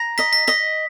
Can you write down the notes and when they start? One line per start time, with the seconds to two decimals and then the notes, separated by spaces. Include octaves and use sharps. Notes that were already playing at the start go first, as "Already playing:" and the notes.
Already playing: A#5
0.18 D#5 B6
0.33 B6
0.48 D#5 B6